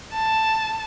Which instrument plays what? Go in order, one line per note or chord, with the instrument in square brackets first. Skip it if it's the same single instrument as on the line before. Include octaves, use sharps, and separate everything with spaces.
[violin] A5